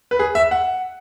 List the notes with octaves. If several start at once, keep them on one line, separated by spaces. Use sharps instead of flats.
B4
G#4
E5
F#5